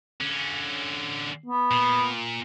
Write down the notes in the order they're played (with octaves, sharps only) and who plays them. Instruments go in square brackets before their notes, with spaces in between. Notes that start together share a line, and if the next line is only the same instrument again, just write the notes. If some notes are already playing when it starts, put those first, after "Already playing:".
[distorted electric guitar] D3 C#4
[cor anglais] B3
[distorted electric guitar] A#2